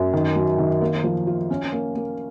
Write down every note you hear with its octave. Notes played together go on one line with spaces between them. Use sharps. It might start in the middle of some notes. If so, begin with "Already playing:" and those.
Already playing: F#2
D#3
F#3
D#3
A#3
F3
F4
C#4
A#3
A#3